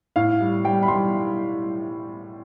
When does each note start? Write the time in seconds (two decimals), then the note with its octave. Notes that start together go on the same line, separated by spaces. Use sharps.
0.16 A2 F5
0.40 G3
0.64 G3 G5
0.83 B5
0.88 G3 C6